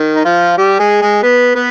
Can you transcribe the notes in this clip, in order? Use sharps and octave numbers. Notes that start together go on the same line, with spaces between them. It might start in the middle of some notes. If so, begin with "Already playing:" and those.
Already playing: D#3
D#4
F3 F4
G3 G4
G#3 G#4
G#3 G#4
B3 B4
B3 B4